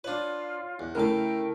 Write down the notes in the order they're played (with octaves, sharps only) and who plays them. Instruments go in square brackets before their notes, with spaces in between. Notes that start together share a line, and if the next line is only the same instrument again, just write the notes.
[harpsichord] D4 B4 [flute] F4 [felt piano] C#5
[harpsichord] E2 [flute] F#6
[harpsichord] C#3 F5 [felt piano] A3 E4 A#4 [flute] G5